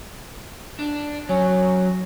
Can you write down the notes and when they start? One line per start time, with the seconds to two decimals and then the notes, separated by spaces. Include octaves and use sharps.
0.79 D4
1.29 F#3 C#4